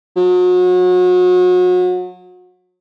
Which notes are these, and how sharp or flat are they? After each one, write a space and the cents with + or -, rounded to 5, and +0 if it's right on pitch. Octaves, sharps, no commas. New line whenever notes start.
F#3 -35